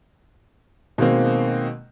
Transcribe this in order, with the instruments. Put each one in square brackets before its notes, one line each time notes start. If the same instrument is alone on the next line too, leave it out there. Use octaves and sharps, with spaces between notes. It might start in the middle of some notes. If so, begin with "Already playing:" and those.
[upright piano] B2 D#3 G#3 A#3 C4